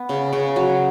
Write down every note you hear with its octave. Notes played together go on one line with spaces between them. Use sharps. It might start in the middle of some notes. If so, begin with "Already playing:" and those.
Already playing: B3
C#3
C#3
F#3